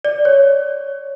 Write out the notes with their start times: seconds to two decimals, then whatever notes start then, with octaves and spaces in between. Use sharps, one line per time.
0.05 D5
0.25 C#5